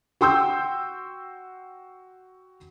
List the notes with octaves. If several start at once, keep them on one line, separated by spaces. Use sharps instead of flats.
F#4 G5 C6 E6 G6